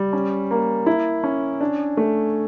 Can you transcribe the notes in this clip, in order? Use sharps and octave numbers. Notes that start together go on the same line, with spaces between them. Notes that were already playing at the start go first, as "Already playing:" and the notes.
Already playing: G3
C#4
A#3
E4
C#4
D4
A3